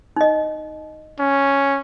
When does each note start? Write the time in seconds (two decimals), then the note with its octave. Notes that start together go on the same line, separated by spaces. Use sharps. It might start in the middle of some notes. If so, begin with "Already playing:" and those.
0.16 D#4 D#5
1.19 C#4